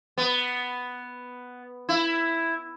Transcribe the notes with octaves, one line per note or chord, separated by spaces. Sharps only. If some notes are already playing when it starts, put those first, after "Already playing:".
B3
E4